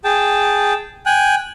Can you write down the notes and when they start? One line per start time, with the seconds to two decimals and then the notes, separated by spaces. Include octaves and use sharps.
0.04 G#4 G5 A5
1.06 G5 G#5 F#6